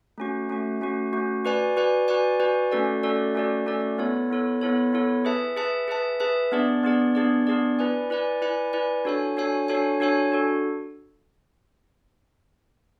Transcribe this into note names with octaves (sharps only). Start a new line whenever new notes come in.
A3 C#4 F#4
A3 C#4 F#4
A3 C#4 F#4
A3 C#4 F#4
F#4 B4 D5 G#5
F#4 B4 D5 G#5
F#4 B4 D5 G#5
F#4 B4 D5 G#5
A3 C#4 F#4 A4 D5
A3 C#4 F#4 A4 D5
A3 C#4 F#4 A4 D5
A3 C#4 F#4 A4 D5
B3 E4 A4 C#5
B3 E4 A4 C#5
B3 E4 A4 C#5
B3 E4 A4 C#5
G#4 B4 E5 A5
G#4 B4 E5 A5
G#4 B4 E5 A5
G#4 B4 E5 A5
B3 D4 G#4 D5
B3 D4 G#4 D5
B3 D4 G#4 D5
B3 D4 G#4 D5
E4 B4 D5 G#5
E4 B4 D5 G#5
E4 B4 D5 G#5
E4 B4 D5 G#5
D4 F#4 A4 C#5 G#5
D4 F#4 A4 C#5 G#5
D4 F#4 A4 C#5 G#5
D4 F#4 A4 C#5 G#5
D4 F#4 A4